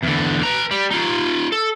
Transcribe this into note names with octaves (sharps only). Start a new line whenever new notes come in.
E2 D3
B4 A#5
G3
D#4 F4
A4